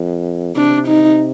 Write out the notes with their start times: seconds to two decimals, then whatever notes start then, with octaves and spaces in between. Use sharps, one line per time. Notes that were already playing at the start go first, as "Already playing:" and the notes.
Already playing: F2
0.56 C3 D4
0.88 D#4